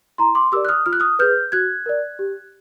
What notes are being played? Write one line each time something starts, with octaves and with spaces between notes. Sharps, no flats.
E4 A#5 C6
C6 D6
G4 A#4 D5 D6 E6
F#6
D#6 F6
F4 F6
F#6
D#6 F6
G#4 B4 F6 G6
F#4 F#6 G#6
A#4 D5
G4